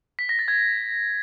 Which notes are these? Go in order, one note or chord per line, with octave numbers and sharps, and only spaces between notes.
B6
A#6
A6
G#6